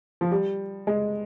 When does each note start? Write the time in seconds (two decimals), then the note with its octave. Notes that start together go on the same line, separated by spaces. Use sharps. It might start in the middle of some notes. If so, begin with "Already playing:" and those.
0.21 F3
0.31 G3
0.87 G#3